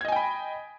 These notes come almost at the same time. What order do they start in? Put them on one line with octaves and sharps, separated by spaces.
G#6 D#5 G#5 G5 B5